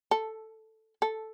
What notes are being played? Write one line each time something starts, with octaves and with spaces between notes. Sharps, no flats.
A4
A4